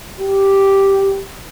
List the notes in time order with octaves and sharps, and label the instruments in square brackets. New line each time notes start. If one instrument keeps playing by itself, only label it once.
[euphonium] G4